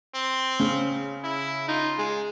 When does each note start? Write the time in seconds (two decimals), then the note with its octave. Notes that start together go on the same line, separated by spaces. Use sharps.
0.15 C4
0.60 C#3
1.24 E4
1.68 D#4 F4
1.98 G#3